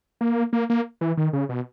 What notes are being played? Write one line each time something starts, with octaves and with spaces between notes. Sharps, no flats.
A#3
A#3
A#3
E3
D#3
C#3
B2